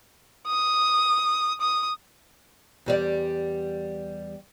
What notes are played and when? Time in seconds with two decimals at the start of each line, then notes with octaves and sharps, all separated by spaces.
0.47 D#6
1.61 D#6
2.86 E2 G3 D5